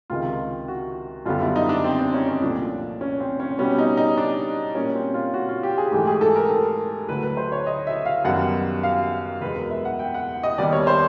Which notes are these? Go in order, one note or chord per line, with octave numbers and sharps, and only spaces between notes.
C#2 C3 D#3 G#3 F4
F#4
F#2 D3 G3 B3 F4
E4
D#4
D4
C4
C4
C#4
C#4
C2 A#2 F3 A3 D4
C#4
C4
C#4
B2 G3 B3 C#4
D#4
D#4
D4
A#2 G3 A#3 C#4
C4
F4
F#4
F4
G4
G#4
G#2 E3 A3 G4
G#4
A4
A#4
A4
D2 D3 F#3 A3 B4
B4
C5
C#5
D#5
E5
F5
F#2 D#3 G3 B3 F#5
F5
E2 B2 G#3 B4
A#4
E5
F#5
G5
F#5
D#5
D#2 D#3 G3 B3 D5
C#5
C5